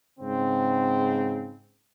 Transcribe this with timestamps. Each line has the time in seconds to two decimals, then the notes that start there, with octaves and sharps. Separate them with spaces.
0.19 G#2 C#3 C4